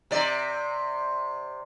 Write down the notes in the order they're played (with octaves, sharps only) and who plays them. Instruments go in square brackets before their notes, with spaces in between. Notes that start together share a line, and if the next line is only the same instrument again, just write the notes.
[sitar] C3 D5